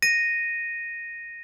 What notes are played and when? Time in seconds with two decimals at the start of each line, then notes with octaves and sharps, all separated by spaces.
0.02 A#6 D#7